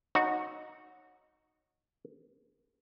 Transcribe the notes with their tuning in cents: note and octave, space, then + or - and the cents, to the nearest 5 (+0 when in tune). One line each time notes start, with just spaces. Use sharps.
D#4 -5 F#4 -10 C#5 -10